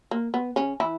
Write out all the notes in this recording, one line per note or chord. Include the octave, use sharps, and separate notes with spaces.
A#3
B3
C#3 C#4
E3 E4